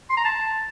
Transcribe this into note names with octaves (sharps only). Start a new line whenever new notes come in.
C6
A#5
A5